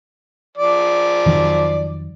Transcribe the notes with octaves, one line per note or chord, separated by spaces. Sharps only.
F3 D5
F2 D#3 F#3